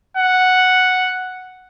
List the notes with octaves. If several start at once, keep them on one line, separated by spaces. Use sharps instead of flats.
F#5